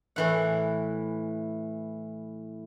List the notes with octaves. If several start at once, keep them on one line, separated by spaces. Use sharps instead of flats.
A2 E3 F#5